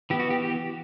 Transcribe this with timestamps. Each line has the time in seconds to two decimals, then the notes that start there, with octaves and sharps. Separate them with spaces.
0.10 E3 B3 G4
0.20 F#4
0.30 G4
0.42 G4